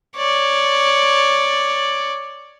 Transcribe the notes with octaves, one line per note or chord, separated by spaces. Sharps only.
C#5 D5